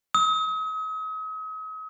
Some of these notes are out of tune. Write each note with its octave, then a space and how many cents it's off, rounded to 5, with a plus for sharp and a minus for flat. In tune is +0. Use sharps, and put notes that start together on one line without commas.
D#6 +40